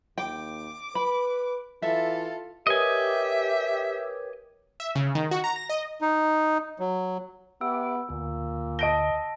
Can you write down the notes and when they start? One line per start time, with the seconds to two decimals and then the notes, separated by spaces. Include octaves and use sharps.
0.18 D#2 G5 D6
0.95 B4 B5
1.82 E3 F4 A4 E5
2.67 G4 A#4 B4 C#5 D#5 E5 G#5
4.80 E5
4.95 C#3
5.15 D#3
5.31 F#4
5.44 A#5
5.56 A#6
5.69 D#5
6.01 D#4
6.79 F#3
7.61 B3 G4 E5 D6 E6
8.10 D2 A#2
8.79 D#5 A5 A#6 D7 G7